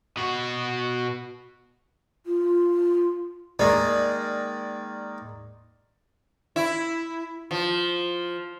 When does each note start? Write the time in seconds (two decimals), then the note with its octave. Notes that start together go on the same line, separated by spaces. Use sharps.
0.17 B2 F#4
2.26 F4
3.59 D#3 G#3 A#3 D5
6.56 E4
7.51 F3